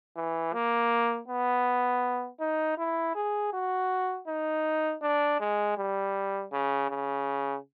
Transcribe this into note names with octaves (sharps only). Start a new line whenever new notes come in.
E3
A#3
B3
D#4
E4
G#4
F#4
D#4
D4
G#3
G3
C#3
C#3